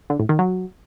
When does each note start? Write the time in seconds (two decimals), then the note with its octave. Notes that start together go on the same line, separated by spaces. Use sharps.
0.10 D3
0.20 A2
0.29 D#3
0.39 F#3